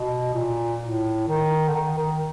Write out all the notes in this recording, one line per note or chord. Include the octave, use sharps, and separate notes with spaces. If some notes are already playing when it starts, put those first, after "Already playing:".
Already playing: B2
A#2
A2
D#3
D3
D#3
D#3